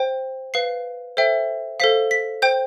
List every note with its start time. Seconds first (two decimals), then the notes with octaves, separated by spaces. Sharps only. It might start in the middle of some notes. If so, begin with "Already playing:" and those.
Already playing: C5 G5
0.54 B4 F5 C7
1.17 A4 C5 E5 G5
1.80 A4 C5 F5 B6
2.11 B6
2.42 C5 G5 G6